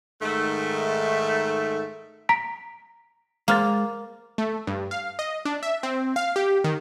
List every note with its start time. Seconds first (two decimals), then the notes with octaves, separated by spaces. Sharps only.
0.22 G#2 D#3 A3
2.29 A#5 B6 D7
3.48 G#3 A#3 C5 F5 F6 A6
4.38 A3
4.67 G2
4.91 F5
5.19 D#5
5.45 D4
5.63 E5
5.83 C4
6.16 F5
6.36 G4
6.64 D#3